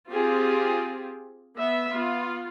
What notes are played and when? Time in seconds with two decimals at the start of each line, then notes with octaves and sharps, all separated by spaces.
0.11 C4 F4 G4 G#4
1.56 B3 E5
1.91 B3 F4